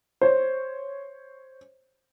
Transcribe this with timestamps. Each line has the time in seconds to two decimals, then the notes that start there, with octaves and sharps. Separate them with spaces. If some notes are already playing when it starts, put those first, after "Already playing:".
0.21 C5 C#5